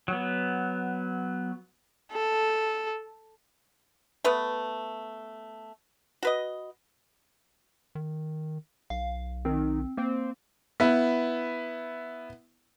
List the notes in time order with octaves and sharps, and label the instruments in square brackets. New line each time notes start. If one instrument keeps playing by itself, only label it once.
[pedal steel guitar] F#3 B3
[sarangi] A4
[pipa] A3 B3 B4
F#4 B4 D#5
[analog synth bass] D#3
[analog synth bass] B1 [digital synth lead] F5
[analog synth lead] D#3 [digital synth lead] C4
[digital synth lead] A#3 [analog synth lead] C4
[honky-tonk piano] B3 E4